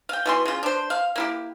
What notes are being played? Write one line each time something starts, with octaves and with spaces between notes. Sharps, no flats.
F5 G5
B2 E3 C6
C#3 F4
D4 C5
F5
A#3 E4 G4